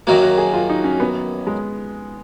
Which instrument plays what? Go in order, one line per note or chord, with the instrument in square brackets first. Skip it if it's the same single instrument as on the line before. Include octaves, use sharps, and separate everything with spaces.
[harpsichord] F#2 D#3 F#3 A#3 [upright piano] F#4
[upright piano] F#4
G#4
F4
D#4
C#4
B3
G#3